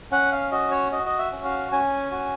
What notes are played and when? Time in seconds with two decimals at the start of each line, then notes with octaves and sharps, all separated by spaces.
0.11 C#4 F#5
0.32 F5
0.52 F#4 D#5
0.71 C#5
0.92 F#4 D#5
1.06 D#5
1.19 E5
1.32 C#4
1.45 F5
1.72 C#4 G#5
2.12 F#4